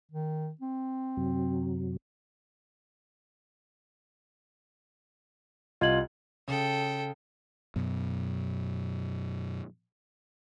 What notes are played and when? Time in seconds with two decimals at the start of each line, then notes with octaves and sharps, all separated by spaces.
0.11 D#3
0.61 C4
1.17 F#2 C3 F#3
5.81 C2 F4 D#5 G#6 F#7
6.48 C#3 A4 G5
7.76 F#2 B2